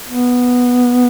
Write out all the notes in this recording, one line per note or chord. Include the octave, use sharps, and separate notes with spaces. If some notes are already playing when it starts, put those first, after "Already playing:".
B3